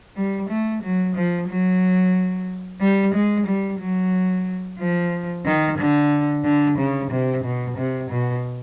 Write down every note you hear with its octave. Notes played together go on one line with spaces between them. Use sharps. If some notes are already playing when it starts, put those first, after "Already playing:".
G3
A3
F#3
F3
F#3
G3
G#3
G3
F#3
F3
D#3
D3
D3
C#3
C3
B2
C3
B2